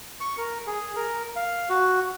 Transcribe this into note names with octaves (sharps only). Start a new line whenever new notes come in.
C#6
A#4
G#4
A#4
F5
F#4